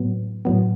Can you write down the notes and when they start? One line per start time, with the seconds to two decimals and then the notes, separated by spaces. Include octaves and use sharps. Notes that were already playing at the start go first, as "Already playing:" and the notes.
Already playing: A2 F#3 B3
0.45 A2 F#3 B3